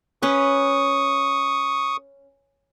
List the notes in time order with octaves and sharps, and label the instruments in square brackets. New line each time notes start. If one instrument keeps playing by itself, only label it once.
[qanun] C#4 B4 [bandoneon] C#6 D#6